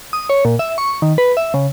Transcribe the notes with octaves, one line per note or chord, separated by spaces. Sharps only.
D#6
C#5
A#2
E5
C#6
D#3
B4
E5
C#3